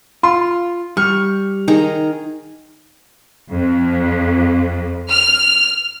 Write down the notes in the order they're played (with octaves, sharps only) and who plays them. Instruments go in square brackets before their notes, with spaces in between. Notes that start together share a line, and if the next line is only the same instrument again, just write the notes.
[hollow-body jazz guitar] F4 [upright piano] C6
[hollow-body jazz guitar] G3 [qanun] C#6 [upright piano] F6
[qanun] D#3 G#4 A#5
[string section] F2
F6